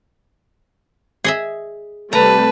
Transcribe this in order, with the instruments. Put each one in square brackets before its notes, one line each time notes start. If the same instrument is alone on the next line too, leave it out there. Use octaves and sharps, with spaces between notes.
[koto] G#4 D#5 E5
[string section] C3 G3 A3 [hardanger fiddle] B4 [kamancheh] A5 [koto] A#5